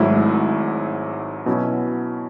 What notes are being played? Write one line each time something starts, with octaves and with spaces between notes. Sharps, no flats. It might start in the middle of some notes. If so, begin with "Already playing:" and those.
Already playing: G#1 G#2 F#3 A3 E4
B2 F#3 C#4 E4